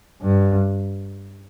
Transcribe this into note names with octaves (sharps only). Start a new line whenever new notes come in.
G2